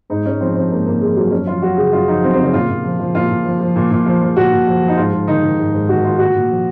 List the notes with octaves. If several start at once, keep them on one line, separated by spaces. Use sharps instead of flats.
G#2 D#4
G#2 C#4
F3 C4
F3 C4
G#2 A#3
G#2 A#3
F3 G#3
F3 F#3
F#2 C#4
F3 F4
F#2 F#4
C#3 G#4
F#2 F4
F3 D#4
F#2 C4
C4
C#3 C#4
A#2 F4
A#2
F3
F3
A#2 F4
A#2
F3
F3
A#2
A#2
F3
F3
A#2 F#4
A#2
F3
F3
D#4
G#2 F4
G#2
D#3 D#4
D#3
G#2
G#2
D#3 F#4
D#3 F4
A#2 F#4
A#2
F3